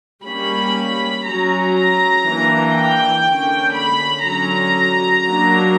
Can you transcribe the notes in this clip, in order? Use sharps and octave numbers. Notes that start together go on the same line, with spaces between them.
G3 A#3 C#4 B5
F#3 C#4 A#5
A#5
E3 A#3 D4
G5
D3 A#3 C#4
B5
D3 F#3 C#4 A#5
F#3 A#3 D4